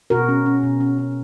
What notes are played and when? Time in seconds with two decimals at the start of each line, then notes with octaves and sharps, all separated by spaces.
0.10 B2 F#4 A#4
0.29 C#4
0.46 C#4
0.63 B2
0.81 C#4
0.98 C#4